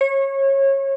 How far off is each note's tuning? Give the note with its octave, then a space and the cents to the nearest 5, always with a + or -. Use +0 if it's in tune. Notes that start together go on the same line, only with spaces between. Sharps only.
C#5 -25